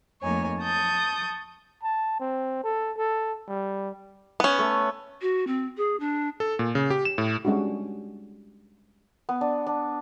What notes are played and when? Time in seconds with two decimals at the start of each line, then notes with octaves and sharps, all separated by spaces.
0.23 F2 A3 A#3 D#4 C#5 G#5
0.61 A5 C#6 D#6 G6
1.83 A5
2.20 C4
2.64 A4
2.97 A4
3.49 G3
4.40 B3 C#4
4.59 A3
5.22 F#4
5.47 C4
5.77 G#4
6.00 D4
6.40 A4
6.59 A#2
6.75 C#3
6.90 G4
7.05 E7
7.18 A2
7.45 G3 G#3 C#4 D4 F#4
9.29 B3
9.41 D4
9.67 D4